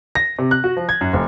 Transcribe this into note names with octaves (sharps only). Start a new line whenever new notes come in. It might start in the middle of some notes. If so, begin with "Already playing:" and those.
A#6
C3
F#6
F#4
F3
G#6
F#2
F1